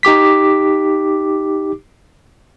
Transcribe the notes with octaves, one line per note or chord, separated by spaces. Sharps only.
D#4 G4 D6 B6